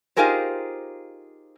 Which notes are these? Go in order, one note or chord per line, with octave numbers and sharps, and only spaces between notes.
D#4 F4 G4 G#4 A#4 C5